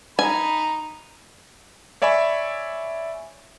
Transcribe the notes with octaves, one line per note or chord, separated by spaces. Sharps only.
D#4 G#5 B5
C#5 D5 E5 G#5 B5 C#6